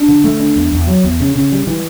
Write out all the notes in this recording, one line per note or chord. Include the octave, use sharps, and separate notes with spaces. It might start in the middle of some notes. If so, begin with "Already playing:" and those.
Already playing: D4
D3
A3
D4
E2
E2
F#3
E2
C#3
C#3
G3
E3